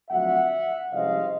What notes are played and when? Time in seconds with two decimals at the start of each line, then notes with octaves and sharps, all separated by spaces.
0.10 F2 D3 F#3 A3 E5 F#5
0.92 C2 C3 F3 G#3 C#4 D#5 F5